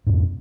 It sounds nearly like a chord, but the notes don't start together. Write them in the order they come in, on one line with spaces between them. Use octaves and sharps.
G#2 F2 B2